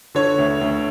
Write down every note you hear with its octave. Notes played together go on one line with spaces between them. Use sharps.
D3 C#5
D2
D2